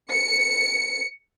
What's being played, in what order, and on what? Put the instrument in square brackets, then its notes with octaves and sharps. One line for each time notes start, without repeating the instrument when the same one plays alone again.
[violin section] C#7